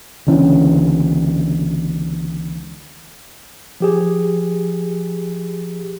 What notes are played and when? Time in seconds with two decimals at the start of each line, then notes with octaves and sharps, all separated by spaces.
0.27 C#2 D3 E3 C#4
3.80 F3 G4 G#4